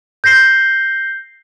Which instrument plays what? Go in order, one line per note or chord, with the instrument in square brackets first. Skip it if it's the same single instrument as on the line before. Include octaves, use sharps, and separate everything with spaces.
[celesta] G6 A#6 C7 G7